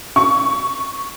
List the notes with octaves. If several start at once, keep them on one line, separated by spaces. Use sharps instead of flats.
C#6